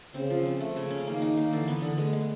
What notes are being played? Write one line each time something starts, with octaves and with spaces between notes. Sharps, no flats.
C#3 C4
F3
C4
A3
C#3
C#4
D#3 A#3
D#4
A#3
D3 E3
B3
D3
G#3 A3
G#3